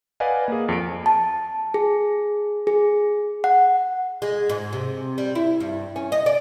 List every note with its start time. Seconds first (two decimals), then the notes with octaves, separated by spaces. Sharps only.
0.20 B4 D5 D#5 F5 F#5 G#5
0.48 A#3 G#4
0.69 F2 D7
1.06 A5
1.74 G#4
2.67 G#4
3.44 F#5
4.22 G#3
4.49 G#2
4.73 C3
5.18 G3
5.35 E4
5.60 G2
5.96 C#4
6.12 D#5
6.26 D5